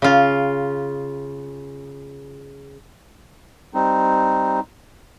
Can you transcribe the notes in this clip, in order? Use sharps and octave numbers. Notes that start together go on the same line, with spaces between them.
C#3 F4
G3 C4 D#4